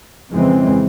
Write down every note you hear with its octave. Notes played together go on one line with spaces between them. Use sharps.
F2 C#3 E3 G#3 C4